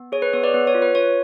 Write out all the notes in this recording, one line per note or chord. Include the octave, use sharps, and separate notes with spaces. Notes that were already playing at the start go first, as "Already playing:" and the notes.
Already playing: B3
G#4 C#5
B4
B3 C#5
B4 D5
B3 B4
C#5
F4
B4
F4 C#5